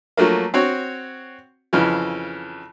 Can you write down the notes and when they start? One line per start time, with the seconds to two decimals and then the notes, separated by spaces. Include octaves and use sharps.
0.17 F3 F#3 A3 A#3
0.54 C4 F#4 C#5
1.73 F2 C#3 E3